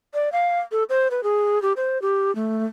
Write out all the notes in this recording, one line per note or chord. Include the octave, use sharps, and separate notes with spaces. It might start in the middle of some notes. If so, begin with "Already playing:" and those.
D5
F5
A4
C5
B4
G#4
G4
C5
G4
A3